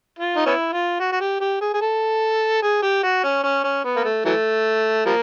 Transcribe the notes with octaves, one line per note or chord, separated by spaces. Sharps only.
F4
D#4
B3 C#4 E4
F4
F#4
F#4
G4
G4
G#4
G#4
A4
G#4
G4
F#4
C#4
C#4
C#4
B3
A#3
A3
E3 F#3 A3
F3 G3 A#3